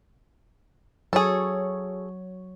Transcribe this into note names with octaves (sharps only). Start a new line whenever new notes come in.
F#3 G#4 A4 C#5